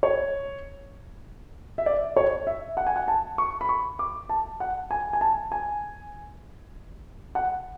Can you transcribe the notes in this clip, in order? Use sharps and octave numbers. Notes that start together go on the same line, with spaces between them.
C#5
E5
D5
C#5
E5
F#5
G#5
F#5
A5
C#6
B5
C#6
D6
A5
F#5
G#5
G#5
A5
G#5
F#5